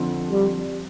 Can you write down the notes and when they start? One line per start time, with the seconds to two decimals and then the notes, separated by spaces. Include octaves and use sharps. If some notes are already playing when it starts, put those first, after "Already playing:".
Already playing: F2 D3 F3 C4
0.31 G3